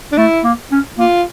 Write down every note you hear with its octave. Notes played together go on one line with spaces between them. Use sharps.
D4
A3 E4
A#3
C#4
A#3 F4